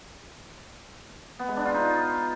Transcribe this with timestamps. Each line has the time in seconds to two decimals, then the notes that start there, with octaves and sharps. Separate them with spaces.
1.39 B3
1.48 G#3
1.57 D4
1.65 F4
1.74 D#4